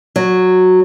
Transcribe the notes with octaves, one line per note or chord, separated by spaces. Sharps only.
F#3